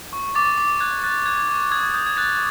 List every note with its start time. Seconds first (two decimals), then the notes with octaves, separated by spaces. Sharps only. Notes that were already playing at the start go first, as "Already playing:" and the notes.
0.13 C#6
0.35 D6 A6
0.58 D6
0.80 F#6 G#6
1.04 F#6 A6
1.26 F#6 G#6
1.49 C#6
1.71 D#6 G#6
1.83 G#6
1.94 D#6 G6
2.06 G#6
2.17 F#6 A6